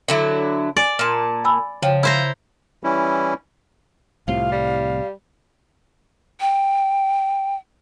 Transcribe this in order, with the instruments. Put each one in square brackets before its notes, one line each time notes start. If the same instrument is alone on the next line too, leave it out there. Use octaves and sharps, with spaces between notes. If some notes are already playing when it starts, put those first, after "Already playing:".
[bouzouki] D3 F#3 E4
[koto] D5 [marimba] G#5
[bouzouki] A#2 A5 [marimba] C6 F6
[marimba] G#5 B5 E6
[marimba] C#3 C#5 G5 [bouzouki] F3
[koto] E4 C5 A#5
[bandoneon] E3 G3 C#4 E4
[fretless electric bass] C2 A2 C3 [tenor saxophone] F4 [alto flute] F5
[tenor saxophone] G3
[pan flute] G5